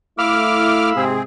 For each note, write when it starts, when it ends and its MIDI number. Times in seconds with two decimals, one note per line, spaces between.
0.19 0.91 57
0.19 0.91 64
0.19 1.05 77
0.19 1.05 83
0.19 0.90 86
0.19 1.05 88
0.19 0.90 89
0.96 1.20 44
0.96 1.20 48
0.96 1.23 60
0.96 1.23 68